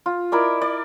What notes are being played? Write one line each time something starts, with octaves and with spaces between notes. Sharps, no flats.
F4
E4 A#4 D5 D#5
D5